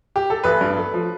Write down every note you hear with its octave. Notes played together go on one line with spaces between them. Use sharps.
G4
A4
A1 B4
G2
A3
F3